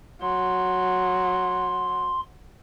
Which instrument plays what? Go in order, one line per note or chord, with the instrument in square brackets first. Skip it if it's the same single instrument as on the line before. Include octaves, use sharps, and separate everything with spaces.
[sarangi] F#3 [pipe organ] C6